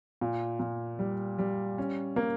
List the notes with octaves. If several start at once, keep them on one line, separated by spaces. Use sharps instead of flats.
A#2
A#2
G3
G3
C#4
A#3